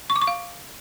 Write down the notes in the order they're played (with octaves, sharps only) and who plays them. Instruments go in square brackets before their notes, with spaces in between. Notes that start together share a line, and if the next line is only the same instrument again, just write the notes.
[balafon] C#6
D6
C#6
F5